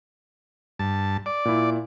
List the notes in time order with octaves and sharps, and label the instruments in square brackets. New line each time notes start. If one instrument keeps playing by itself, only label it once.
[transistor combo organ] G2 A5
D5
[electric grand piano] A#2 E4